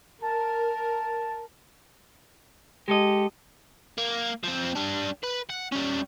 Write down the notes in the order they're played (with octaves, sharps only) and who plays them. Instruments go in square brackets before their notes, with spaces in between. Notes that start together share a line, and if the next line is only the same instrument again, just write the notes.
[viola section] A#4 [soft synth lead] A5
[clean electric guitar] G#3 A4 D#5 [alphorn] G4
[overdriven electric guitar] A#3
F3 C4
G3 D4
B4
F#5
G3 C#4